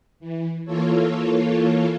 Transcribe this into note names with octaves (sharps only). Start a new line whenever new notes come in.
E3
E3 A#3 F4 A4 C#5